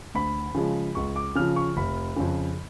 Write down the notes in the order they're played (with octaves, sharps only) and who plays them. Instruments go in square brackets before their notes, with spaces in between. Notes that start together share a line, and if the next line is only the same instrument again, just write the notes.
[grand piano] D2 B5
C#3 F3 G#3
C#2 C#6
D6
C#3 F3 F6
C#6
F1 B5
F2 C#3